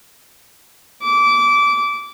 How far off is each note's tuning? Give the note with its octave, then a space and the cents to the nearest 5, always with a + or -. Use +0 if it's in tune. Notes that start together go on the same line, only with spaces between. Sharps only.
D6 -20